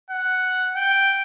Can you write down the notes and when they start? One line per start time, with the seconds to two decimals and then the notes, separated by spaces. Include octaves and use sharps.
0.11 F#5
0.76 G5